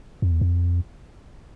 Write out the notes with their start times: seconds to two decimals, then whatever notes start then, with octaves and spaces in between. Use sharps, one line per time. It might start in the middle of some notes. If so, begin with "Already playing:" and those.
0.22 F2
0.32 E2
0.41 F2